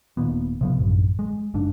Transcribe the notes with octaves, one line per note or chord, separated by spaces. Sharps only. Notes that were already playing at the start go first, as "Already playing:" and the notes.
D#1 D#2 A#2 B3
C3 F3 B3
A1 F#2
G#3
F#1 G#2 D4